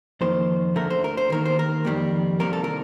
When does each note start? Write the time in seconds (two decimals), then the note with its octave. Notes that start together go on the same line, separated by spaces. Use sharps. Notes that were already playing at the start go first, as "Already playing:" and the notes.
0.21 F2 D#3 A#3 C5
0.76 D2 D3 A3 A#4
0.90 C5
1.04 A#4
1.17 C5
1.30 D#2 D#3 A#3 A#4
1.45 C5
1.59 A#4
1.85 F2 D#3 G3 A#3
2.40 C2 C3 D#3 G3 A#3 A#4
2.53 A4
2.64 A#4